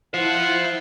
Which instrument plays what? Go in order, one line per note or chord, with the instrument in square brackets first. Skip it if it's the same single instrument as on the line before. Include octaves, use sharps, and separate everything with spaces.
[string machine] E4 [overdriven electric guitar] C5 F5 [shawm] F#5